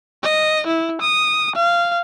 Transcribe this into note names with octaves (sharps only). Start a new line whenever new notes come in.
D#5
E4
D#6
F5